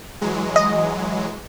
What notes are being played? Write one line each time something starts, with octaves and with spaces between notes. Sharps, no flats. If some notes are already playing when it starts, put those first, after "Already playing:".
E3 F#3 G#3
D#5